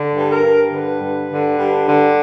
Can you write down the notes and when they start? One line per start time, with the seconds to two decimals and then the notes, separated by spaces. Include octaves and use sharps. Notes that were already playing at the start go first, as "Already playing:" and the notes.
Already playing: D3
0.16 G2
0.30 A#4
0.44 G2
0.73 D3 B4
1.01 G2
1.30 D3
1.58 G2
1.87 D3